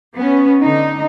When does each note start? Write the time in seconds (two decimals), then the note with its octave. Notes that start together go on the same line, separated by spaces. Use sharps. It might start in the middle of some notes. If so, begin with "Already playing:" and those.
0.16 B3 C#4
0.60 D3 D#4